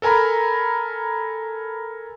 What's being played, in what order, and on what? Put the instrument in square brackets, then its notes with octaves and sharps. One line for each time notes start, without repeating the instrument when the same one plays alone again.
[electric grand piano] A4 A#4 G#5 A#5 B5